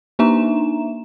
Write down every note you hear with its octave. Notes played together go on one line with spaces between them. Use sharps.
A#3 D4 D#4 E5 A#5 E7